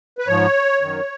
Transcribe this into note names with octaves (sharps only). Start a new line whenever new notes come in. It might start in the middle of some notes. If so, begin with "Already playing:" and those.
B4
G#2 F3 C#5
F#2 D#3